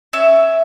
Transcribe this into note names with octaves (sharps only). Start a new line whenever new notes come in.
C#4 E5